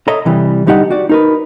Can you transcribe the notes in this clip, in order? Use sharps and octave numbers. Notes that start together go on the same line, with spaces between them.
A4 C#5 D#5 E5 A#5
C3 E3 G3
D3 G3 D#4 G4 F#5
F#4 D5
D#4 A#4 B4